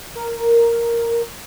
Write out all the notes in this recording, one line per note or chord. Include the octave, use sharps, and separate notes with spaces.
A#4